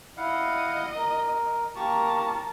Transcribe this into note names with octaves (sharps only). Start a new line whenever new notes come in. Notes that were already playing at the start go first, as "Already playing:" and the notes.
E4 D#5 F5 F#5
A#4
A#3 G4 A#4 A5 C#6